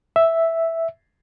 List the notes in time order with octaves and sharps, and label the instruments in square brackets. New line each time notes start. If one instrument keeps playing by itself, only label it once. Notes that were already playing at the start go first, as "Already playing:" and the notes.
[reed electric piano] E5